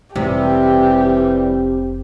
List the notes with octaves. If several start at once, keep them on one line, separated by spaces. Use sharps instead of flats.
F1 C3 E3 G3 G4